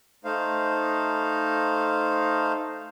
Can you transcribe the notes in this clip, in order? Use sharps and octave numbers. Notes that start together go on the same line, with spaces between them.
A3 D#4 C5 F5